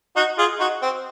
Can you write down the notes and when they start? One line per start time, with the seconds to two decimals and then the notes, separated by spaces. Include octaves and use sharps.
0.16 D#4 F#4
0.38 F4 G#4
0.60 D#4 F#4
0.82 C4